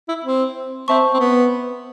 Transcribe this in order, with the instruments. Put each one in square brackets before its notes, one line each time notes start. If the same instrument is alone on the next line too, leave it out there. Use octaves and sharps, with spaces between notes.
[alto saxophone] E4
C4
[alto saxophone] C4 [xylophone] C5 E5 A5 C#6
[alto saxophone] C4
B3